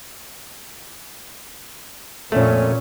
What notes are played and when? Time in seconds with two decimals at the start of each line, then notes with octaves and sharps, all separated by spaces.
2.32 F2 A#2 A3 C#4